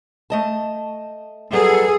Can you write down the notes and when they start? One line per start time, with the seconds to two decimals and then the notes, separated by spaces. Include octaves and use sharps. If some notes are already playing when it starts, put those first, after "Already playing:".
0.30 A3 D#5 A5
1.53 F#3 G3 B3 G#4 A4